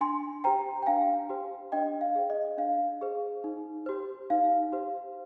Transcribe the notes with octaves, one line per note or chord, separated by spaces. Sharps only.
D4 G#5 C6
G4 C5 G5 A#5
G5
D4 F5 G#5
G4 C5
D4 D#5 G5
F5
G#4 C5
D#5
D4 F5
G#4 C5
D#4
G4 C5
D#4 F5
G4 C5